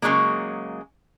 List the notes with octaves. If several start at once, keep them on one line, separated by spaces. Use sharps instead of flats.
C#3 E3 F#3 G#3 A#3